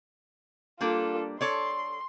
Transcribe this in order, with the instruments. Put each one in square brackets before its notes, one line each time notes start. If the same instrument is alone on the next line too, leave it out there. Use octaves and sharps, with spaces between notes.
[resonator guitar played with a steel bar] G3 A#3 D4 [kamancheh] F4 A4
[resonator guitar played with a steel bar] A4 C#5 D5 [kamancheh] C6